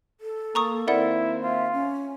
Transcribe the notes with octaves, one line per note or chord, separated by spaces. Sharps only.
A4
A#3 A#5 C#6 D#6
D#3 A#3 C4 E4 A#4 D5 F#5
F4 E5
C#4